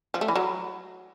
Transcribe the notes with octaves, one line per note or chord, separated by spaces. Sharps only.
F3
A3
E3
F#3